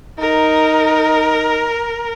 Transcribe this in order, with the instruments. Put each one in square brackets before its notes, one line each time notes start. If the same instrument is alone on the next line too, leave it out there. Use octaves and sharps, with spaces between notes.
[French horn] D#4 [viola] A#4